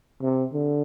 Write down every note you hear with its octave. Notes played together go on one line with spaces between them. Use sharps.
C3
D3